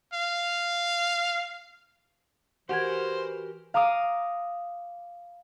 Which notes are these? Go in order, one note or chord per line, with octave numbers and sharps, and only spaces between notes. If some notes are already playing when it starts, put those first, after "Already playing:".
F5
E3 F#4 G4 A#4 C5 F#5 G#5 G#6
F5 A#5 D6 D#6